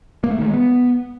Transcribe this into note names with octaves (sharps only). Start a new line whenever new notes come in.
A#3
A3
D#3
G#3
B3